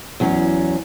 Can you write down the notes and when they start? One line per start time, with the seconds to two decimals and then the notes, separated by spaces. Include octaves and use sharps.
0.20 E2 F#3 C#4